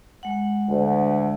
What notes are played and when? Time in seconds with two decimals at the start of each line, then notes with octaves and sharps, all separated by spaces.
0.23 G#3 F#5
0.69 D2